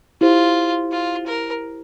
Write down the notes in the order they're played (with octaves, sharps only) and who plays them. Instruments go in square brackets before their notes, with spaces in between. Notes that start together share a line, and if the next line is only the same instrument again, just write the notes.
[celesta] E4 G4 C5 [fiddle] F4
[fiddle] F4
A#4